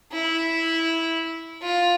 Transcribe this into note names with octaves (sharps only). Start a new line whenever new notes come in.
E4
F4